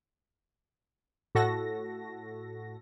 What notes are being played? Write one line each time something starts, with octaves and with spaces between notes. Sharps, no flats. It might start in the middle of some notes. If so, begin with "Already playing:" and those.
A2 F#4 A4 A#6